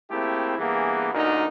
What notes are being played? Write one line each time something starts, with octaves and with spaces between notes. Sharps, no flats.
A3 A#3 C4 E4 G4 G#4
G2 E3 A#3 B3 G#4
D2 A#2 D3 D#4 F#4 A#4